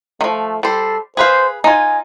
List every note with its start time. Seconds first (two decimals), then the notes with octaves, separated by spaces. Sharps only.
0.21 D#3 F3 A3
0.63 G3 A4 C5
1.17 G#4 B4 C5 F5
1.64 D#4 F4 G#5